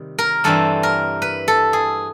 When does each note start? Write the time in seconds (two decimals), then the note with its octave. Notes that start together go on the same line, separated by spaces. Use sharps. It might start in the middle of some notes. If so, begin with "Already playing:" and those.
Already playing: C3 D#3 G3
0.18 A#4
0.44 G2 E3 G3 C4 A4
0.83 A#4
1.22 B4
1.48 A4
1.73 G#4